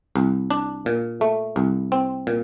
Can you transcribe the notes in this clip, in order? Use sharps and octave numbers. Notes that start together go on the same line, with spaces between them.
C2
D4
A#2
A3
C2
C4
A#2